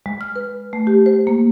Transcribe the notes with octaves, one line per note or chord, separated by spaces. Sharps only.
G#3
F6
B4
A3
G4
C5
A#3